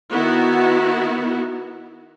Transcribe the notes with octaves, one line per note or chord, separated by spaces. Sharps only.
D#3 B3 E4 F#4